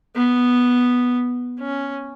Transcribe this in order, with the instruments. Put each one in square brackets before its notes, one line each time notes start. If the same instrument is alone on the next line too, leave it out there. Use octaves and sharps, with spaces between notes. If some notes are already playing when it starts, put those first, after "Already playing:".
[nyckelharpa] B3
C#4